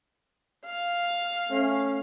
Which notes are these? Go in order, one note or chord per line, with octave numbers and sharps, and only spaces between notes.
F5
A3 C#4